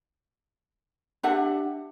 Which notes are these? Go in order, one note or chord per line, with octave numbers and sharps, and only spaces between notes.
D4 G4 E5 F#5